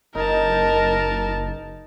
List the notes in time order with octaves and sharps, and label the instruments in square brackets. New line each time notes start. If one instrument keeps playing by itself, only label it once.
[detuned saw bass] F#1 [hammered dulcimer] D#4 [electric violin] A#4 A5